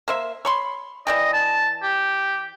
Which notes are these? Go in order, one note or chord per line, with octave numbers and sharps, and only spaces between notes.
A#3 C5 E5
C#5 B5 C6
E3 D5 D#5 G5
A5
G4